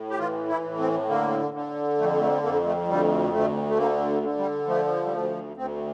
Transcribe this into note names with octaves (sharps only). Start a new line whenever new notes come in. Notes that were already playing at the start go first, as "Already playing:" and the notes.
Already playing: A2
G4
E3 F4
E4
A2
C4
D3 A#3
D3
F2 A3
A3
F2 A#3
A3
D2 G3
D2 A3
A3
D3 A#3
D3
G3
F3 A3
G3
D2 A3
D2 C4